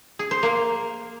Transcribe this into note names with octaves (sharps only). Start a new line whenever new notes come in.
G#4
C5
A#3